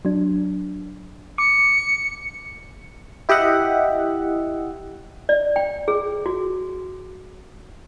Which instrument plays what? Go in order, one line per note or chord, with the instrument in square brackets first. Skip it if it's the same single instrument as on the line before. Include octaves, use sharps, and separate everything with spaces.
[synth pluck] F#3 D4
[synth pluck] D6 [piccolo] C#7
[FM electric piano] E4 G4 D#5 E5 F#5
[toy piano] D5
G5
G#4
F#4